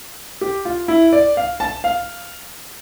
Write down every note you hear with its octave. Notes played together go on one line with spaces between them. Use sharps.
G4
F4
E4
D5
F5
A5
F5